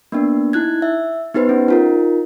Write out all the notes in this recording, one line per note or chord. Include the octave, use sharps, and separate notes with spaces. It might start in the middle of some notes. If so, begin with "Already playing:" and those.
A#3 B3 D4
D#4 E4 F#6 G#6
E5
B3 D#4 G4 B4 C5
C#4
D#4 F4 A#4